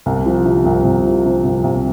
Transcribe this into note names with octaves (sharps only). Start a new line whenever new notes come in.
C2
F3
C3
C2
C2
F3
C3
C2
C2